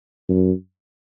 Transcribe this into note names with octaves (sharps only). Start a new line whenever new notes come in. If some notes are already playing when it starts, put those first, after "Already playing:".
F#2